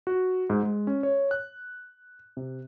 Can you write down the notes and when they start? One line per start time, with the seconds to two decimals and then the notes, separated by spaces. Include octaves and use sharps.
0.07 F#4
0.50 G#2
0.63 G#3
0.87 C#4
1.03 C#5
1.31 F#6
2.37 C3